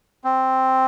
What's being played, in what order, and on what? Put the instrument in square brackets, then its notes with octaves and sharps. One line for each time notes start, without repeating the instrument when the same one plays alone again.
[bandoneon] C4